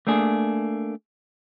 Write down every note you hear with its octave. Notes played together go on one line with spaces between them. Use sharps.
A3 A#3 D4 G#4